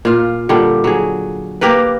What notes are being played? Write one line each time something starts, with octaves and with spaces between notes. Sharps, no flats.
A#2 F4
A#2 D3 G3
F#3 G#4
A#3 G4 A#4 B4